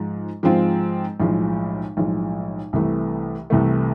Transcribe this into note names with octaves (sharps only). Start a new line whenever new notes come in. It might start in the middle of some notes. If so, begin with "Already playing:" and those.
Already playing: G#2 F3 G#3 F4
G#2 F3 G#3 C4 F4
B1 A2 F3 G#3
B1 A2 F3 G#3
C2 C3 E3 A3
C2 C3 E3 A3